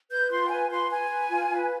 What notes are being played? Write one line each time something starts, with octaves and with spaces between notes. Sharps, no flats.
B4 G6
F4 C6
G5
B4 G#5
B4 C6
B4 G#5
B4
F4
B4